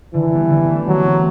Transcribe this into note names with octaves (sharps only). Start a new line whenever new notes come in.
D3 E3
G3 B3
D3
A3 D4
E3 F#3
A3 C4